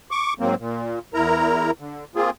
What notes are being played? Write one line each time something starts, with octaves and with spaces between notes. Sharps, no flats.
C#6 D6
G#2 F#3 A#3 C4
A#2
E2 E4 A#4 A#5
D3
A#3 C4 F4 G#4